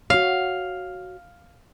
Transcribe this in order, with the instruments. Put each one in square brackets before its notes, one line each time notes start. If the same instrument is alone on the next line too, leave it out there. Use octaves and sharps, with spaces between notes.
[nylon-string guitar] F#4 C#5 [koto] F5